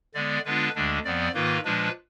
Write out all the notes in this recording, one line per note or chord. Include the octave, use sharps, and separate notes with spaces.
D3 G#3 B3 D5
D3 G#3 B3 D4 F4 B4
D2 D3 G#3 D4
F2 F3 B3 D5
G#2 D#3 A#3 F4 B4
A#2 F3 G#3 D4 B4